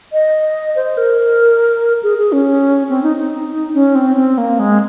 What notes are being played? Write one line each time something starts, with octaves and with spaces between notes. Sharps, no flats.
D#5
C5
A#4
G#4
G#4
C#4
C4
D#4
D#4
C#4
C4
C4
A#3
G#3